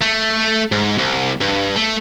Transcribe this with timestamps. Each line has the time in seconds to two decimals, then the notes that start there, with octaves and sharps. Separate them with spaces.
0.02 A3
0.72 G#2
0.98 C2
1.41 G2
1.76 A3